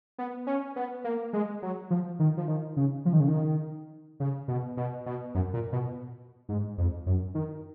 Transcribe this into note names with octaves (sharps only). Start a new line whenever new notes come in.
B3
C#4
B3
A#3
G#3
F#3
F3
D#3
F3
D#3
C#3
F3
D#3
C#3
D#3
C#3
B2
B2
B2
F#2
A#2
B2
G#2
F2
F#2
D#3